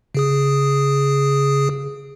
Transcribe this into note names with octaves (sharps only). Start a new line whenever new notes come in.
C#3 G#4 D#6